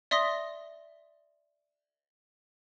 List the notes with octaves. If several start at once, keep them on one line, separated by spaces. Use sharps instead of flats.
D5 E5 C6 D#6 A#6 G7